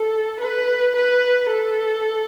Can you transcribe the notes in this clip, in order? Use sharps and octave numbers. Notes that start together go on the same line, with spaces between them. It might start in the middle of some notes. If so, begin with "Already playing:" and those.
Already playing: A4
B4
B4
A4